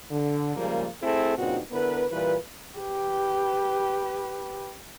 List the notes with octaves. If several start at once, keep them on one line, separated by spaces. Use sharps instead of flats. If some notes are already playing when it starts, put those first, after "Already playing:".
D3
C#3 F3 G3 G#3 A#3
A3 C4 E4 G#4 A4
G2 A#2 C#3 C4 D#4 F#4
D3 B3 E4 A#4 B4
A#2 E3 G3 F4 B4
G4 B4